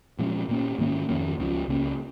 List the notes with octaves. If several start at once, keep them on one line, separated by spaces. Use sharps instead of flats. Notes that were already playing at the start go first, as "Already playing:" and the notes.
A#2 F3 G#3 C#4
A#2 A#3 C#4
G#2 D#3 A#3 C#4
F2 D#3 A#3 C#4
C#2 C#3 F3
C#2 C#3 A#3 C#4